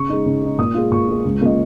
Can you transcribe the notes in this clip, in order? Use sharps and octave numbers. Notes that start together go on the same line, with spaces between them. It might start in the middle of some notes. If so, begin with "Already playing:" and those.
Already playing: C#3 C#6
G#3 D#4
C#3
G#3 D#4
A#2 D#6
G#3 F4
A#2 C#6
G#3 F4
C#2
C#3 A#3 C#4 F4 D#5